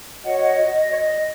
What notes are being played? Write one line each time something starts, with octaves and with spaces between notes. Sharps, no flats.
F#4 C#5 D#5 F#5
D#5 F#5
D#5
D#5
C#5
D#5